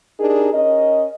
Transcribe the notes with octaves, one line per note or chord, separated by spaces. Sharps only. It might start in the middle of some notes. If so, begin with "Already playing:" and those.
D4 D#4 G4 G#4 A#4
C#4 A#4 D#5